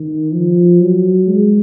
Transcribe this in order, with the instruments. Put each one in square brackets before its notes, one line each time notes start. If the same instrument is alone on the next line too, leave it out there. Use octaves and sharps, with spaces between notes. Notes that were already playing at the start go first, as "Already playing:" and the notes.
Already playing: [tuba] D#3
F3
F#3
G#3